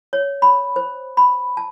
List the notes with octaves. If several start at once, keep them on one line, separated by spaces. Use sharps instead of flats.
C#5
B5
C5
B5
A5